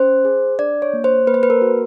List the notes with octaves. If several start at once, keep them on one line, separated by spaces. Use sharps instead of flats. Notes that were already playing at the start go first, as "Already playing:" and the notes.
Already playing: C#4 C5
G#4
D4 D5
C#5
A#3
C5
A#3 B4
C5
B4
A#4
F#4